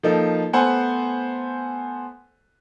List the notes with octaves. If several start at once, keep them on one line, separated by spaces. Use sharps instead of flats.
F3 A#3 D#4 A4
A3 B3 A4 C5 F#5 G#5